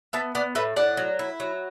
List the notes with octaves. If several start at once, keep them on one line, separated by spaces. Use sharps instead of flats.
B3 E5 A5
B3 D5 F#5
A2 B4 E5
A2 D5 F#5
F#3
E4
F#3